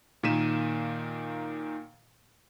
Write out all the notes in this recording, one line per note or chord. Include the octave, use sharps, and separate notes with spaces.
A#2 D#3 A#3 B6 D#7 E7